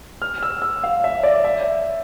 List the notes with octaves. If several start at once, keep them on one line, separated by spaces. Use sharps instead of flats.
F6
E6
E6
F5
E5
D5
E5